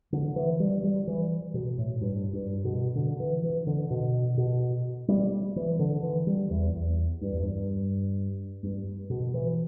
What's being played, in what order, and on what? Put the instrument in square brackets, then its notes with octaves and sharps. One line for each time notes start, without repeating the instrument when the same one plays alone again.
[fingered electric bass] D3
E3
G3
G3
E3
B2
A2
G2
G2
B2
D3
E3
E3
D3
B2
B2
G3
E3
D3
E3
G3
E2
E2
G2
E2
G2
G2
B2
E3